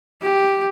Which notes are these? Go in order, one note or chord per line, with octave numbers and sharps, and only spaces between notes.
G4